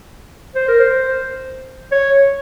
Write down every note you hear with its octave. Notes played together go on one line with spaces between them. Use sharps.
C5
A#4
C5
C#5